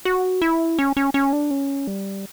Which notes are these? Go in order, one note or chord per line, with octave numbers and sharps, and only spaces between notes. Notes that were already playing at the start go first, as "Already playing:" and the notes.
F#4
E4
C#4
C#4
C#4
D4
C#4
G3